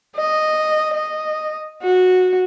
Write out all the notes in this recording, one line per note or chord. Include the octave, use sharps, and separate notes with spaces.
D#5
D#5
F#4